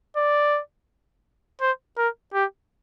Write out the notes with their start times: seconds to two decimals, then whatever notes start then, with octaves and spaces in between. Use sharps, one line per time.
0.17 D5
1.61 C5
1.98 A#4
2.34 G4